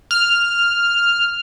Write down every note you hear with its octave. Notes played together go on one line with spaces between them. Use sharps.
F6